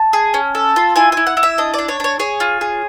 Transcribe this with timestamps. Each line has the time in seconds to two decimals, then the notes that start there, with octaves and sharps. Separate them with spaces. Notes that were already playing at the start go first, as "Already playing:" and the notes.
Already playing: A5
0.13 G#4
0.34 C#4
0.55 A4
0.76 F4
0.96 E4 G#5
1.12 E4 G#5
1.27 F#5
1.37 E4
1.43 E5
1.58 D4 D#5
1.74 D4 D5
1.88 C#5
2.00 D4 C#5
2.19 G#4 C#5
2.40 F4
2.61 G#4